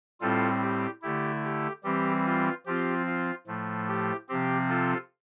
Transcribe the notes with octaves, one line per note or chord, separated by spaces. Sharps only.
A2 G3 C4 F4 A4
G4
D3 A3 E4 G4
G4
E3 G3 C4 G4
F4
F3 C4 F4 G4
F4
A2 F3 A3
G4
C3 F3 C4 G4
F4 A4